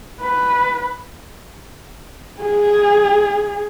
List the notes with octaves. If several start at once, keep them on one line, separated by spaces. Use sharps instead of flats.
B4
G#4